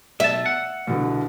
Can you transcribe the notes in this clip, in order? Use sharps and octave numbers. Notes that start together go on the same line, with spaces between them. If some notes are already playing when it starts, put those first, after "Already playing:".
B1 E5 A5
F#5
C2 B2 D3